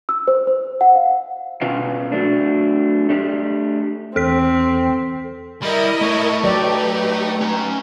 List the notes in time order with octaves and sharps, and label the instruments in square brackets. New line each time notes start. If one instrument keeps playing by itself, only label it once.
[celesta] E6
C5
C5
F#5
F5
[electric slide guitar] B2 C#4 F4 B4 F5
F#3 A3 D4
A3 D4 G4
[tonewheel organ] E2 [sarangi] C4 [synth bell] A4 B6
[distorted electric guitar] G3 [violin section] E4 A#4 D#5
[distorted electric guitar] A3 C#5
[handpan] F#3 D5 [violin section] D#4 G4 B4
[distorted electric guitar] C#4 A#5